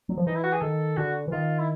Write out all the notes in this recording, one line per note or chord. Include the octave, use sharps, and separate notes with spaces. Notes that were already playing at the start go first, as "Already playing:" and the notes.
F#3
F3
E3 D#4
E4
F#4
G#4
D#3 A4
D3 F#4
E3
D#3 F4
E4